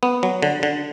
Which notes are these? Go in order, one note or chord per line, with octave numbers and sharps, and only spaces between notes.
B3
F#3
D3
D3